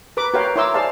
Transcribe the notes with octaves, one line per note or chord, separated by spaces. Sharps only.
A#4 B4 B5 D6
F#4 A#4 B4 C#5 F5 G5
E4 A#4 C#5 C6 D6 E6
G#4 C5 D5 F5 A5